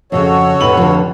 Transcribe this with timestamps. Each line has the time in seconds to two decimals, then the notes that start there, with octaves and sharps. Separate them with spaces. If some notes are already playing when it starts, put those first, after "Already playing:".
0.12 F2 A#2 C#3 F#4 A4 C#5
0.61 F1 D#4 B4 F#7
0.77 D3 F3